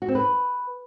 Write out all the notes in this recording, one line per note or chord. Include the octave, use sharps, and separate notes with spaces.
F#4
C4
B4